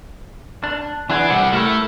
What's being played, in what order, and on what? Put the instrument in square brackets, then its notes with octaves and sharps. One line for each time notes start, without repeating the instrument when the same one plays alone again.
[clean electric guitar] D4
[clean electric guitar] E3 B3 G#4 [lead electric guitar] D4
[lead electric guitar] C3 G3 [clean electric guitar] C4 G4 F#5
[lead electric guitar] A3 [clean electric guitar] E4 A#4 C#5